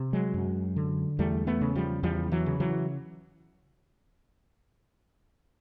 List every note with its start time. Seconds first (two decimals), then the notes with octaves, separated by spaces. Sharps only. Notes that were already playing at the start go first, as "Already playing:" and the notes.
Already playing: C3
0.13 F#3 G#3
0.34 F#2
0.76 D3
1.19 E2 G3 A3
1.47 A3 B3
1.61 C#3
1.75 F3 G3
2.03 E2 F3 G3
2.32 E3 F#3
2.46 C#3
2.60 E3 F#3